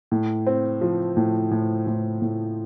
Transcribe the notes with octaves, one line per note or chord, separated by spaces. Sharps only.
A2
C4
F3
A2
A2
A2
A2